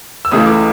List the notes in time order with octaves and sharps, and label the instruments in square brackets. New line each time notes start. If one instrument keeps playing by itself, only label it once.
[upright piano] E6
C#2 C#3 E3 A3 D#6
D6